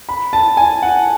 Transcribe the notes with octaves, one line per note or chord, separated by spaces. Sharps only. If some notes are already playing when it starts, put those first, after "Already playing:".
B5
A5
G#5
F#5